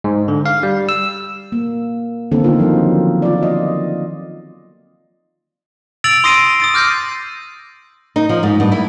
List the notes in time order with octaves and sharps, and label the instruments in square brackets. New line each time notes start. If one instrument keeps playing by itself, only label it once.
[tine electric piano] G#2
D3
F5
G3
E6
[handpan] A#3
D3 D#3 A#3 C4 A4
A#3 B3 D#4 F4
F3 F#3 D#4
F4 D5
D#5
[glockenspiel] E6 A6 D7 F7 F#7
C6 D#6 A#6 C7 D7 D#7
D#6 A6 D#7
D6 F6 G6 A#6 C7
[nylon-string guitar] D#4
F3
G#2
G2
E4